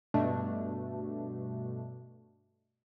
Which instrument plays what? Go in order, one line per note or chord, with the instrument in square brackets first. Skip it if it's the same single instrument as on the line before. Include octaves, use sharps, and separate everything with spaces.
[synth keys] G2 B2 A3 D4